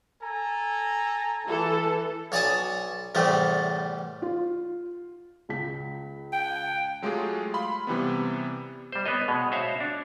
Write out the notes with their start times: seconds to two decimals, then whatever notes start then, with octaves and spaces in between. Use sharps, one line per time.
0.23 A4 G#5 A#5
1.47 E3 A4
2.32 B1 C#5 D5 G#5 A5 D#6
3.15 E2 A2 C3 G3 A3
4.22 F4
5.49 C#2 B6
6.33 G5
7.02 F#3 G#3 A3 F4 G4 G#4
7.54 F5 B5 C6
7.87 C3 E3 G3 B3
8.92 G3 C5
9.06 B3 B4 C#5 D#5
9.28 B2 G#3
9.52 F#4 C5 C#5 E5 F5
9.80 D4